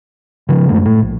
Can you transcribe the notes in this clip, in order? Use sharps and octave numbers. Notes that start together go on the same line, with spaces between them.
C#3 F3
F#2 G#3 A3 D4
A2 A3
A#1